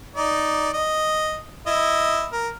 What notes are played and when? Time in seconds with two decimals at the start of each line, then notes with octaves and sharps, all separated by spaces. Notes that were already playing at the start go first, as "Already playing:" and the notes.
0.16 D#4 D5
0.74 D#5
1.67 E4 D#5
2.33 A#4